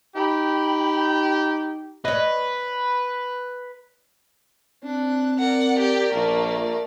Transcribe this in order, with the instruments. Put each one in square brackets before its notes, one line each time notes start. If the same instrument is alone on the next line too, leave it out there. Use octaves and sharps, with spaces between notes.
[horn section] D#4 G4 [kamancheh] G5 B5
[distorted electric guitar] B4 [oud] C#5 D#5
[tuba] C4 [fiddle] D4 F#6
[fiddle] A#4 D5 [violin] F#5
[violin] G4
[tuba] A#1 [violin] A3 A#3